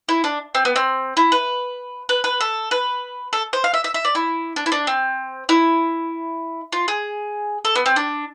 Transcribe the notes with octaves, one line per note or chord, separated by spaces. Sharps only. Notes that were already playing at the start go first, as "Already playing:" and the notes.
E4
D4
C4
B3
C4
E4
B4
B4
B4
A4
B4
A4
C5
F5
E5
E5
E5
D5
E4
D4
E4
D4
C4
E4
F4
G#4
A4
B3
C4
D4